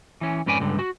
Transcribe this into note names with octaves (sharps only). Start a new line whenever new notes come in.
E3 C#4
F2 G#2 C#4 B4 D5 G#5
C#2 G2 D3
F#4